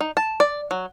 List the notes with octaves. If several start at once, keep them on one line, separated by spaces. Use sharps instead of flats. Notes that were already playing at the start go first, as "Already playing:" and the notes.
D#4
A5
D5
F#3